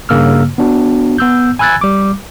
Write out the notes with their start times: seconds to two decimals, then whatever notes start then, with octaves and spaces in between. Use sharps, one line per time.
0.09 G2 C#3 A#3 E6 F6
0.58 B3 D4 F#4
1.18 B3 E6 G6
1.59 G#5 B5 E6 F#6 G#6 A6
1.81 G3 D6